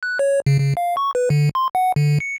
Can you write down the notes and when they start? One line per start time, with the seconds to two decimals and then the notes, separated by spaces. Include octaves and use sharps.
0.03 F#6
0.19 C#5
0.46 C#3
0.58 C#3
0.77 F5
0.97 C#6
1.15 B4
1.30 D3
1.55 C6
1.75 F#5
1.96 D3
2.20 C#7